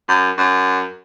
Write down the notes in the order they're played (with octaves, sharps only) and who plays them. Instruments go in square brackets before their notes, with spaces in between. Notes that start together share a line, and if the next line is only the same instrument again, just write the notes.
[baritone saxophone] F#2
F#2